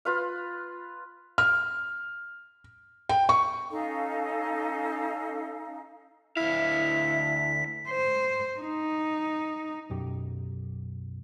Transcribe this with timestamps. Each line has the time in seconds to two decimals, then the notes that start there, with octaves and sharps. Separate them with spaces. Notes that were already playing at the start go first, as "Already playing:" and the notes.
0.05 F4 B4 F5
1.38 F6
3.09 G5
3.29 C#6
3.70 C#4 D#4 A4 F5
6.37 D2 E4 F5 B6
7.88 C5
8.60 D#4
9.90 B1 F#2 G4